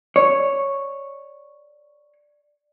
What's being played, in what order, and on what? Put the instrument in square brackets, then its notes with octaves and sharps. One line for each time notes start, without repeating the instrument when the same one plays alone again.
[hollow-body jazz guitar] C#5 [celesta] D5